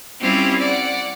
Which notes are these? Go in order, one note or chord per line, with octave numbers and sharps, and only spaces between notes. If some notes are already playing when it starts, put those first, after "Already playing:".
G3 C4 C#4 E4 F4 G4
D5 F#5